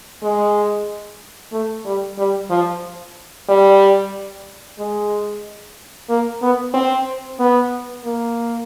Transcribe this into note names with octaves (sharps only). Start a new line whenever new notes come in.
G#3
A3
G3
G3
F3
G3
G#3
A#3
B3
C4
B3
A#3